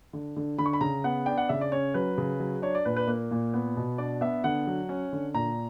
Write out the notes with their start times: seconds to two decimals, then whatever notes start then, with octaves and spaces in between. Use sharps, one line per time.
0.13 D3
0.36 D3
0.58 D3 B5
0.66 C#6
0.73 B5
0.81 C#3 A#5
1.04 B3 F#5
1.26 D4 G5
1.38 F#5
1.49 C#3 E5
1.61 D5
1.72 C#4 C#5
1.94 F#3 B4
2.18 C#3
2.40 F#3
2.62 D4 C#5
2.75 D5
2.85 A#2 B4
2.97 B4
3.08 A#3
3.31 A#2
3.54 B3
3.77 B2
3.98 D4 D5
4.21 B3 E5
4.44 D3 F#5
4.67 F#3
4.89 C#4
5.13 D3
5.34 A#2 A#5